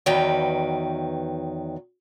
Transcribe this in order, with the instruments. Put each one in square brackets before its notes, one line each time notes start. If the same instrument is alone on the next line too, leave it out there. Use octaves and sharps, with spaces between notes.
[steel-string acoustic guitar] E2 D#3 F#3 B4 G5